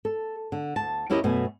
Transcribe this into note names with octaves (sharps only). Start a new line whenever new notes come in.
A4
D3
D2 A5
D#2 C#4 E4 G4 A#4 D#5
F#2 B2 A3 G#5